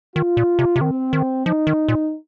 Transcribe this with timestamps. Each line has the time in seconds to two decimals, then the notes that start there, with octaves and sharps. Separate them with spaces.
0.15 D#3 F4
0.37 A#2
0.59 C3
0.76 C3
0.80 D#3 C4
1.13 D#3
1.46 F3 D#4
1.67 D#3
1.88 A#2